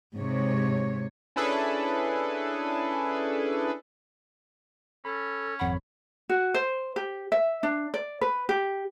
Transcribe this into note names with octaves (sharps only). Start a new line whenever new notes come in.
G#2 C3 C#5
C#4 D4 E4 G#4 A4 B4
C#4 A4 B5
G#1 F2 C#5 F#5 B5
F#4
C5
G4
E5
D4
D5
B4
G4